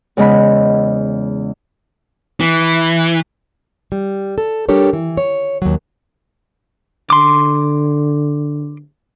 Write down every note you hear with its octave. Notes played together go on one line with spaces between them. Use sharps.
E2 C#3 G#3 D#5 F#5 B5
E3
G3
A4
G3 D4 G4 A4 A#4 C#5
E3
C#5
D#2 F#3
D3 C6 D6